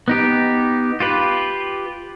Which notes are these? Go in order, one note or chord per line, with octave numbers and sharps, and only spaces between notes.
B3 D#4 G4
F4 G4 B4